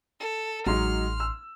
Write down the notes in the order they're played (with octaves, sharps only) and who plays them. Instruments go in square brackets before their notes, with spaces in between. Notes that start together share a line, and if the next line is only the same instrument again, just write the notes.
[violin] A4
[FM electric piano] A1 C6 [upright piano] F#3 G#3 D#4 [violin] F6
[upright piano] E6